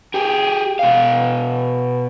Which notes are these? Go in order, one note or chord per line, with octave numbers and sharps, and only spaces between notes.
G4 G#4
B2 F5